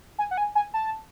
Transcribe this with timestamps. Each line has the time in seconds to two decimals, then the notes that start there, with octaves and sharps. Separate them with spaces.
0.19 G#5
0.31 F#5
0.38 G#5
0.55 G#5
0.74 A5